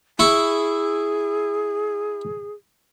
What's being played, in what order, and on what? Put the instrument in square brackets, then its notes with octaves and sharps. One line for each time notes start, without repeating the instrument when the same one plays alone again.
[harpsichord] E4 C#6 [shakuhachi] G#4